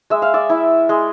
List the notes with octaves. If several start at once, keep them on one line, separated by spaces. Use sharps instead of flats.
G#3 E5
F5
D5 E5
E4
G#3